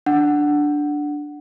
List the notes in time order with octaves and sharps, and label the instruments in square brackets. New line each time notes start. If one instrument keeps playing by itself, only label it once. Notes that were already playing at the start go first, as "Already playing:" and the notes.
[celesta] D4 F#5